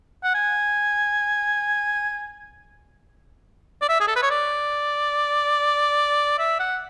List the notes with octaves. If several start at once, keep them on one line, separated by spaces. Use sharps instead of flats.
F#5
G#5
D5
E5
G#4
A4
B4
C#5
D5
E5
F#5